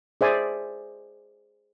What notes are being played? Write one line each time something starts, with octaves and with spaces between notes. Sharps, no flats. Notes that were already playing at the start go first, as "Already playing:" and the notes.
G#4 C5 D5 E5 G#5 C6